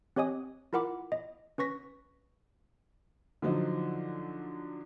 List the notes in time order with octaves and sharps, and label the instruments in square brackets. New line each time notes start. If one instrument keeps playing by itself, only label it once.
[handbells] C4 G4 C#5 D#5 G#5 D#6
E4 F4 A#4 F#5 B5 D6
D#5
C#4 B4 C#6 A#6 B6
[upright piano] D3 F3 F#3 D#4